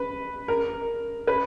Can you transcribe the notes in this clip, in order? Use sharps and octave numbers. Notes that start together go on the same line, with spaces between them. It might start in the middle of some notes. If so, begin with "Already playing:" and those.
Already playing: B4
A#4
B4